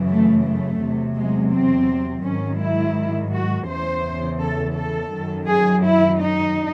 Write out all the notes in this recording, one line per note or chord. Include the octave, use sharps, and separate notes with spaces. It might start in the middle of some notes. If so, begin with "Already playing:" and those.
Already playing: F#2 C#3 E3
A3
A3
E2 C3 F#3
G#3
C4
G#2 D#3 F#3 C#4
E4
F#4
E2 C#3 E3 C5
A4
A4
F#2 D#3 F#3
G#4
E4
D#4